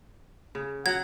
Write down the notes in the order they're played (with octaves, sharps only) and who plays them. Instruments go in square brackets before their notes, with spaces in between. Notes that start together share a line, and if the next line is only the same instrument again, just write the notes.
[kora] C#3
[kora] F#3 [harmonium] F#5 [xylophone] G#6